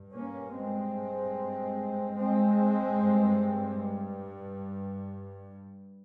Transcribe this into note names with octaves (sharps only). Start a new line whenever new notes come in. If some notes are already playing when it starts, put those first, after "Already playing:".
Already playing: G2
A#3 C#4
G#3 C4
G#3 C4
G2